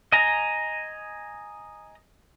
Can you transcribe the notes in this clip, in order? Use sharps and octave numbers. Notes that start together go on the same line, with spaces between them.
D#5 G#5 A#5